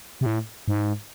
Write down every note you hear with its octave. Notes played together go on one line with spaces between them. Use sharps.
C3
A2
G#2